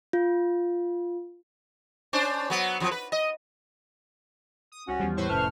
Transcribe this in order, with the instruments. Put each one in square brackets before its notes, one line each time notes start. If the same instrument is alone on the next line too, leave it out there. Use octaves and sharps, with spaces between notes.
[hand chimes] F4
[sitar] C#4 D4 C5
F#3 B3
F2 F3 F#3
B4
D#5
[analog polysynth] D#6
[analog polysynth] C2 [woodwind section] C#4 F#4
[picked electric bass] E2 G3 [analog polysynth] F3
[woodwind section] A2 [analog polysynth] B4 C5 C#6
[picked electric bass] F1 A2 [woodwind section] F#2 A3 F6 [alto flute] A5